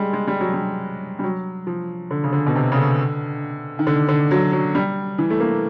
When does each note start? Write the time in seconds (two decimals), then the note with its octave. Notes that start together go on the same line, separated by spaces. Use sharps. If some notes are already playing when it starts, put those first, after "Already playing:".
Already playing: G3 G#3
0.13 G#3
0.27 G3
0.40 F#3
0.53 G3
1.19 G3
1.23 F#3
1.67 F3
2.11 D3
2.24 C#3
2.33 D3
2.47 B2
2.55 C3
2.72 C#3
2.76 D3
3.79 D#3
3.87 D3
4.08 D3
4.31 F#3
4.52 F#3
4.75 G3
5.18 E3
5.30 A3
5.40 A#3